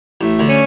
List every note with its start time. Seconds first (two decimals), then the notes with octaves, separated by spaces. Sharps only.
0.21 A1 A2 A3
0.39 D2 D3
0.49 C#4